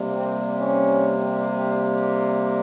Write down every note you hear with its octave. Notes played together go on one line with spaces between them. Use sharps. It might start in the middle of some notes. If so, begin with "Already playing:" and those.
Already playing: C3 G3 A#3
C4
C#4